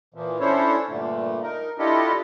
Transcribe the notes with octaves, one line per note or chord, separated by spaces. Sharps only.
A#2 E3 F3
C#4 D4 E4 A4 C5 C#5
G2 A#2 D3 A3
D#4 A#4
D4 E4 F4 G4 A4 D#5